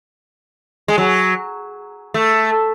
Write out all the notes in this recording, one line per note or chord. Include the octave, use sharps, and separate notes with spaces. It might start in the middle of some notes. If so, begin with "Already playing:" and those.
G#3
F#3
A3